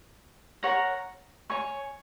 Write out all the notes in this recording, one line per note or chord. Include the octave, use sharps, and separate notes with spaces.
A#4 C#5 F#5 A#5
C#5 G#5 C#6